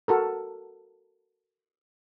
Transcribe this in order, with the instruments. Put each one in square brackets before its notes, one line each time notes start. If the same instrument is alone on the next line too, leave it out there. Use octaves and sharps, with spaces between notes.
[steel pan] F#4 A4 A#4